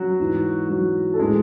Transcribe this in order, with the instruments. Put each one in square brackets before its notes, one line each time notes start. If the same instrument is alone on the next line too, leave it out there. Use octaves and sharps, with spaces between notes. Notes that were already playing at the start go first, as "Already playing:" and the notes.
Already playing: [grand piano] F#3 F#4
G#2 E3
F#3 F#4
A4
A2 E3 G#3 G#4